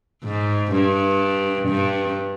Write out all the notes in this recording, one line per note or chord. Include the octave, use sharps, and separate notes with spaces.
G#2
G2
G2